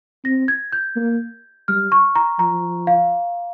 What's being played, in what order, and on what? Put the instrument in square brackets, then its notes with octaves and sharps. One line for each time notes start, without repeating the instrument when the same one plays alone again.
[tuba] C4 [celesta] A#6
[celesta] G#6
G6
[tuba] A#3
[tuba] G3 [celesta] F6
[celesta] C#6
A#5
[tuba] F3 [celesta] A#5
[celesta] F5